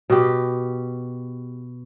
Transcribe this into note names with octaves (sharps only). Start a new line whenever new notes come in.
B2 G4